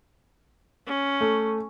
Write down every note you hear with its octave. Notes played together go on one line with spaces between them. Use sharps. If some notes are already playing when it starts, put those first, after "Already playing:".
C#4
A3